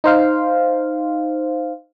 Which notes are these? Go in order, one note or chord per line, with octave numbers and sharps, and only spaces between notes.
D#4 C5 F5